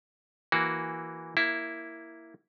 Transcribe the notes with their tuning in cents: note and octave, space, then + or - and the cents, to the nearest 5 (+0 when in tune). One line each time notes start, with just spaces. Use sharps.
E3 +0 A#3 +0 F#4 +0
A#3 +0 E4 +0